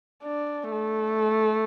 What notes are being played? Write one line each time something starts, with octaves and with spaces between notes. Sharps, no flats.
D4
A3